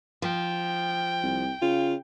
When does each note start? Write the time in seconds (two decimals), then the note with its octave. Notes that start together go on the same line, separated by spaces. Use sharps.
0.22 F3 G5
1.23 C2
1.62 C#3 F4